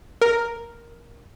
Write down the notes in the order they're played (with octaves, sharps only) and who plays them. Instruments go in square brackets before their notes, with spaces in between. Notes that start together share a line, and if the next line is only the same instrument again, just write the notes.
[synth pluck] A#4